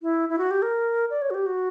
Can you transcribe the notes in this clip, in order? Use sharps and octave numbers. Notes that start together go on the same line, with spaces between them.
E4
E4
F#4
G4
A#4
D5
C#5
F#4
G4
F#4